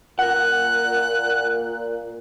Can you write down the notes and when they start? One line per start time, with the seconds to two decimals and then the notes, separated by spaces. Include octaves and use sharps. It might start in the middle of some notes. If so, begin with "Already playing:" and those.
0.19 A#2 A#4 F#5 F#6